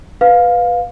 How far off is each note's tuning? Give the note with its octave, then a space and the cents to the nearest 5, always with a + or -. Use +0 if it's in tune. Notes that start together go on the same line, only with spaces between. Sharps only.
B4 +0 F5 +15